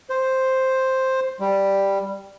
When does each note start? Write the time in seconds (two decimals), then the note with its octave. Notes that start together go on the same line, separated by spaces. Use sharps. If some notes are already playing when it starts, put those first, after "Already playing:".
0.10 C5
1.40 G3